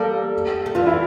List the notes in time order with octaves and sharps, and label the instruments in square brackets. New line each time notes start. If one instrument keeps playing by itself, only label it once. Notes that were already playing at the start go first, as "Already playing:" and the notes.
Already playing: [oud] G3 A#3 [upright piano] A4
[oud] A3
[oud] E3 G3 [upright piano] F4
[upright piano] E4